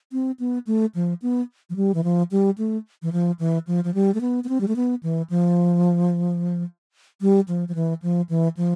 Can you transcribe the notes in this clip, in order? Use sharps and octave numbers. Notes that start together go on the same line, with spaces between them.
C4
B3
A3
F3
B3
F3
G3
E3
F3
G3
A3
E3
F3
E3
F3
F3
G3
A3
B3
B3
C4
G3
A3
B3
E3
F3
G3
F3
F3
E3
F3
E3
F3